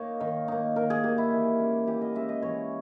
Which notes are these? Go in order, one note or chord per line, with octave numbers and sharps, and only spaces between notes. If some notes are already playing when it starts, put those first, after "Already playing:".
Already playing: A#3 D#4 C#5 D#5
D#3
A#3 D#4
D#3 A#4
G#4
A#3 D#4 G4
E4
E3
G#3 C#4
E3 G4
D#5
G#3 C#4 E5
D#5
E3 C#5